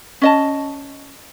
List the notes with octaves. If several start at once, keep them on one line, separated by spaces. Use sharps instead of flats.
C#4 D#5 A5